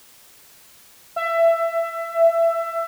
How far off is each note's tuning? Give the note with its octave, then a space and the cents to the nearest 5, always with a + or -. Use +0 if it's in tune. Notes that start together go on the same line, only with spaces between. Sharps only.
E5 +20